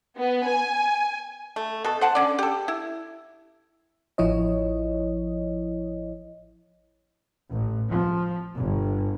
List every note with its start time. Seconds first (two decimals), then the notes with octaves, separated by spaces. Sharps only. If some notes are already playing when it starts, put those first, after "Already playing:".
0.17 B3
0.47 G#5
1.56 A3
1.84 B2 A4
2.01 C5 F#5 A5
2.15 D3 C#4 D5
2.39 G4 A4
2.68 E4
4.18 A1 F3 E4 C#5 D#5
7.49 A1
7.89 F3
8.57 G1